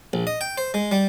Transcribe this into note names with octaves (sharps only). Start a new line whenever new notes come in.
A#1
D#5
G5
C5
G#3
G3